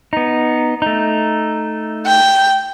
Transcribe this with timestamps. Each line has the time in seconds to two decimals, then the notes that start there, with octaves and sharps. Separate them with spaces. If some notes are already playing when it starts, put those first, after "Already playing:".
0.13 B3 D#4
0.82 A3 D#4
2.06 G5